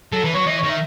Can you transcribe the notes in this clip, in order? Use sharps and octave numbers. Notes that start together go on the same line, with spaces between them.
F#3 A4
E3 B4
F#3 C#5
E3 D#5
C#5
D#3
E5